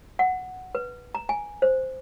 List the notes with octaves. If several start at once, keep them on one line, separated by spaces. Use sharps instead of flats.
F#5
B4
A#5
G#5
C5